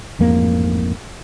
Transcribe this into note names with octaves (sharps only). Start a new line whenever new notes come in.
A1 F2 G#2 A#3